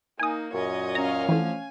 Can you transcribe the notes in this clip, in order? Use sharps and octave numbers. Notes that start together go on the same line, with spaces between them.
A#3 D#4 G#5 D#6
F#2 A#2 C#5 D#5
C#4 F5 A#5
D3 E3 F3 A3 G#5